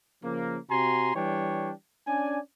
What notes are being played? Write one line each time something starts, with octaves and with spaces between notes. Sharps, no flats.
C#3 F3 A#3
C3 F#4 G#5 A#5 C6
E3 G3 D4 C#5 G5
C#4 D4 D5 G#5